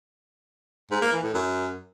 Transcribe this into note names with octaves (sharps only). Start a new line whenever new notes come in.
G#2
A#3
E3
A2
F#2